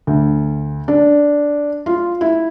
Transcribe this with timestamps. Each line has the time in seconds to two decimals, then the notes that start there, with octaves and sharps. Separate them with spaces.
0.07 D2
0.88 D4
1.86 F4
2.21 E4